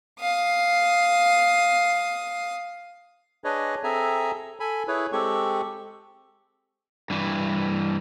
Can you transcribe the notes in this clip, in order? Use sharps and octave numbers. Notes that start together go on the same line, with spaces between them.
F5 D#6
D4 G#4 B4 C#5 D#5
C4 G#4 A4 E5 G#5 A#5
A4 G#5 B5
E4 G#4 B4 C#5
G#3 C4 G4 A4 C#6
G2 E3